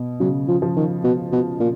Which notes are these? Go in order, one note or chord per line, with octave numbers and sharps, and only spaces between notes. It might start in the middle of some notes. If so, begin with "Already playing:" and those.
Already playing: B2
C#3 F#3
F3
F3
D#3
B2
B2
A#2